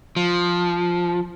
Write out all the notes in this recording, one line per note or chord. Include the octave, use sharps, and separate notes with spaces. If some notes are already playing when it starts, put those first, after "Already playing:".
F3